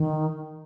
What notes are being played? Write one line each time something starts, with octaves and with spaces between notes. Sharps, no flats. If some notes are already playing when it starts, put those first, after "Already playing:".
Already playing: D#3